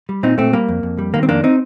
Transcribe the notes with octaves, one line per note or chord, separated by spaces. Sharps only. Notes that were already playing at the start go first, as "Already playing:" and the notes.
G3
A#2 C4 D#4
A#2 A3 C4
G3 A#3
F2
F2
G3
D#3 A#3
C4
F2 A#3 D4
C4 D#4